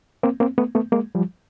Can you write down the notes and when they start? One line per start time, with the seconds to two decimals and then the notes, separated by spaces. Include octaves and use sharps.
0.23 A#3 C4
0.40 A#3 C4
0.58 A3 B3
0.75 A3 B3
0.92 G#3 A#3
1.15 F3 G3